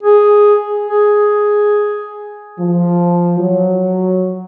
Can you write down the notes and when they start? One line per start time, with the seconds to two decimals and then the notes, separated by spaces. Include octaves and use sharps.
0.03 G#4
0.86 G#4
2.59 F3
3.40 F#3